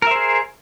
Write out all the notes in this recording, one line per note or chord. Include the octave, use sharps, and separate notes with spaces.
G#4 A#4 C5 E5